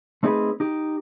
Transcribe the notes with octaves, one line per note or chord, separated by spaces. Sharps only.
A3 C4 D#4 G#4 A4 B4
D#4 G4